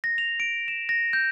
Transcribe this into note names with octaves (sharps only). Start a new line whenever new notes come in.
A#6
F7
D7
E7
A#6
G6